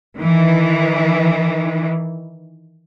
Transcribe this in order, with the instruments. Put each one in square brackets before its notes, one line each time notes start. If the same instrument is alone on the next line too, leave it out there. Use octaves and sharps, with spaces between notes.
[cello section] D#3 E3